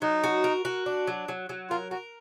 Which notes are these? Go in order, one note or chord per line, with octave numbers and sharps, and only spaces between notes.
F#3 D#4
F#4
A#4
F#4
D4
F#3
F#3
F#3
F4 A#4
F#4 A#4